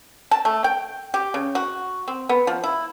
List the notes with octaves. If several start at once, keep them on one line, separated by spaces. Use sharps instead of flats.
A5
A3
G5
G4
C#3
F#4
C4
B3
F3
E4